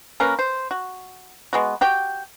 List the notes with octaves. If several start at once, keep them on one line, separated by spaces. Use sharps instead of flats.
A#3 C#4 A#4 B4
C5
F#4
G#3 B3 F#4
F#4 G4 G5